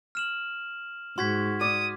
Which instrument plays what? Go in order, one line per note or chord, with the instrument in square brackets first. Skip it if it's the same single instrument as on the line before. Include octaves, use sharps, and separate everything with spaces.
[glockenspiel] F6 E7 F#7
[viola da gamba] G#2 [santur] F#4 [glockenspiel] C6 G#6 B6
[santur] D5 [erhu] D#6